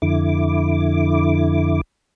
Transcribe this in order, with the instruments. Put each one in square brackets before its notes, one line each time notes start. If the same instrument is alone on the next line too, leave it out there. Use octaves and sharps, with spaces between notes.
[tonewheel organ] F2 D3 E4 D6